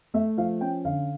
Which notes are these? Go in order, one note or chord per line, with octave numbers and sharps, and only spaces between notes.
A3 E5
F3 F5
C#4 G5
D3 F5